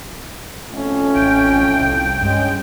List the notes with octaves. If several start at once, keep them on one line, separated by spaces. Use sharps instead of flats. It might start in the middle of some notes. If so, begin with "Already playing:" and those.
F2 A2 A3 C#4
A1 G5
C2
G2 G#3 C#4